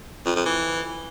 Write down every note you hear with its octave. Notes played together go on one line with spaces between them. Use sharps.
F2
F2
E3